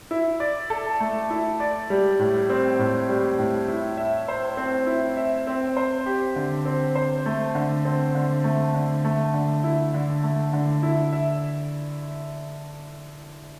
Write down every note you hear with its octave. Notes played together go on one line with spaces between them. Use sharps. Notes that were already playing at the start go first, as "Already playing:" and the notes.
E4
D5
A4
A3
E4
D5
G3
A2
C4
A2
G3
A2
E4
E5
C5
C4
E4
E5
C4
C5
G4
D3
C4
C5
A3
D3
C4
D3
A3
D3
A3
D3
E4
D3
A3
D3
E4
E5